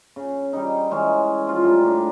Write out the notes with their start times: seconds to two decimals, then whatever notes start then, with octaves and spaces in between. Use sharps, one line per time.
0.16 C#3
0.53 G3 D#4
0.91 E3 G#3 C#4
1.47 F3 F4 D5
1.64 A2 G3 A#5
1.84 D4 G4